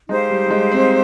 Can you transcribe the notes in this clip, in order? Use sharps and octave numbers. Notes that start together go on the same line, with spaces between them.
G#3 D#4 G4 C5 F5
G3
G3
G#3
C4